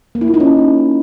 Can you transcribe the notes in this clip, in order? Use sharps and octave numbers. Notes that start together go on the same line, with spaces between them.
A#3
E4
F4
D#4
C#4